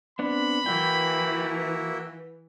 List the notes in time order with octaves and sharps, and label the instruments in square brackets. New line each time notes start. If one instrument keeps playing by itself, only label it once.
[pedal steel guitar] B3 C4 D4 [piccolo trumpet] B5
[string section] E3 [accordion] A#3 E4 F#4 [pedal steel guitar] G5